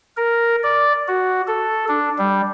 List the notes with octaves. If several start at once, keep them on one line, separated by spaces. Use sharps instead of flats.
A#4
D5
F#4
A4
D4
G3